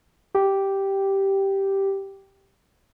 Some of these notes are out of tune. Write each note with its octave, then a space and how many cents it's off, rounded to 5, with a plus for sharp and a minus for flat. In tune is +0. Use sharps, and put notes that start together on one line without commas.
G4 -5